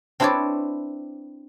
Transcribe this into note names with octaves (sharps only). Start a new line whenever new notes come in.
C4 D4 E4 B4 C#5 D5